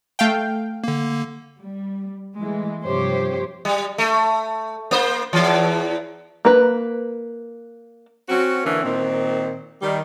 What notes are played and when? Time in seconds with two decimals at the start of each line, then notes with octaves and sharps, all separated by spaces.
0.19 A3 F5 G5
0.84 D3 A#3
1.61 G3
2.38 E3 G#3 A3
2.84 G2 C3 F3 G4 C5 C#5
3.65 G3
3.98 A3
4.91 A#3 C5
5.33 E2 E3
6.45 A#3 B4
8.29 C4 C#4 F#4
8.64 D3 E3 A#3 C#4
8.83 A#2 D#3 C4
9.82 D#3 G3